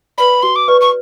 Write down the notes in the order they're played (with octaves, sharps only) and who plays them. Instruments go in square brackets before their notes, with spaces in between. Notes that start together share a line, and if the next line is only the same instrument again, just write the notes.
[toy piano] B4 D5 [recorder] B5
[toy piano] F#4 [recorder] C6
[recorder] D6
[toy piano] B4 D5 [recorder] C#6
[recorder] C#6